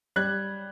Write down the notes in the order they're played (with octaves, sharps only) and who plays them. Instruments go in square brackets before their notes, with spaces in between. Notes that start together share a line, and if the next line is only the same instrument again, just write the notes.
[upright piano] G3 F#6 G#6